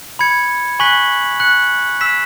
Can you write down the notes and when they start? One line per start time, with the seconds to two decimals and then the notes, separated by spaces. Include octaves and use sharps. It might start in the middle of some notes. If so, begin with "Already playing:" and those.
0.19 B5 G#6 C#7
0.80 G#5 C#6 F#6 B6 F#7
1.40 F#6 C#7 F#7
2.01 E6 B6 E7